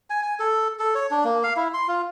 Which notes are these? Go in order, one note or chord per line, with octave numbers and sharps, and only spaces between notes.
G#5
G#5
A4
A4
C#5
D4
A#3
F5
E4
C6
F4